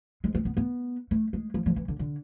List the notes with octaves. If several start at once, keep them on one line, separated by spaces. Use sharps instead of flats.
G#3
C4
B3
B3
A3
G#3
F3
F3
E3
D3
D3